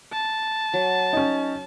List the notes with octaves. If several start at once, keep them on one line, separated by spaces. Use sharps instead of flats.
A5
F#3
C#4 D#4